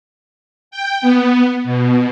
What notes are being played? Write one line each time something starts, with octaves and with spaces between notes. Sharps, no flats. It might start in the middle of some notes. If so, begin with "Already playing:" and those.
G5
B3
B2